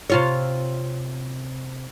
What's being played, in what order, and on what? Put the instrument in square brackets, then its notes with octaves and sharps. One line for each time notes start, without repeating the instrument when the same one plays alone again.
[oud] C3 F4 C#5